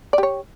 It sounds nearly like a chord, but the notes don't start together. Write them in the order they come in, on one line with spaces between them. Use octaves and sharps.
D5 G4 C#5